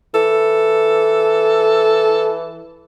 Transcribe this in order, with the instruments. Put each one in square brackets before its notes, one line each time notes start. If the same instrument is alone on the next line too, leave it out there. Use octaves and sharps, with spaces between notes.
[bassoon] E3 [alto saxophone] A4